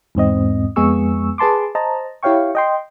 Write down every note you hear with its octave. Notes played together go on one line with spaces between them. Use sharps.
E2 G#2 C4 D#5
F2 G#3 B3 G#4 C#6 E6
G#4 B4 A5 C6 D6
C5 D#5 A5 A#5
E4 G4 C#5 F5 G5 C#6
D#5 G5 C6